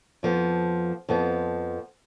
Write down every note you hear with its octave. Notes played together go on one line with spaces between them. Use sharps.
F2 F3 B3
F2 F3 B3